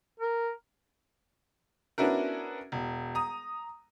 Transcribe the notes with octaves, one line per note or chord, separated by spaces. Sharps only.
A#4
B3 C#4 D4 E4 F#4 A#4
E1
A#5 D#6